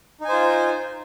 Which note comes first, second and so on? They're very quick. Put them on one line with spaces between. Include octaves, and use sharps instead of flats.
D#4 G#5 C5 F4